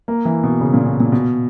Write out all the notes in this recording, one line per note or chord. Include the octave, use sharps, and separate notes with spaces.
A#3
E3
B2
C#3
A#2
B2
A#2
B2